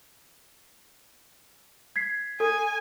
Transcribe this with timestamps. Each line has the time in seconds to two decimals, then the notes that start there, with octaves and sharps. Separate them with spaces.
1.96 G#6 B6 C7
2.40 A4 G#5